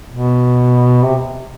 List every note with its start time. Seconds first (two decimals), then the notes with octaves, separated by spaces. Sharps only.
0.12 B2
1.03 C3